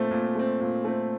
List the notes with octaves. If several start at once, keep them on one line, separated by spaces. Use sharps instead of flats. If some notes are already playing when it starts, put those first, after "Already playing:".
Already playing: A#2 A3 C4
A#2
A3 C4
A#2
A3 C4